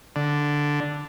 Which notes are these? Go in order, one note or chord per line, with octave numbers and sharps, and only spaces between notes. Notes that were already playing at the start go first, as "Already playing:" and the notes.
D3